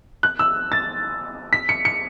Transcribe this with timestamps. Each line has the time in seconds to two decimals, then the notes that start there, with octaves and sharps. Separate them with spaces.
0.23 F#6
0.39 E6
0.72 A6
1.53 B6
1.69 C#7
1.85 C#7